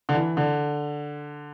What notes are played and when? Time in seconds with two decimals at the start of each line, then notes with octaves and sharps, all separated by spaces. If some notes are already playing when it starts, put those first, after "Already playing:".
0.09 D3
0.14 E3
0.37 D3